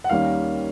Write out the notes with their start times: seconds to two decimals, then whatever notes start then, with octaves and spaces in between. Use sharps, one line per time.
0.04 F#5
0.09 D#2 D#3 G3 A#3 C#4 F5